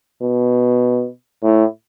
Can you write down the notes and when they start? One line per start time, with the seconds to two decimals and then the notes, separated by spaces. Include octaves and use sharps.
0.23 B2
1.43 A2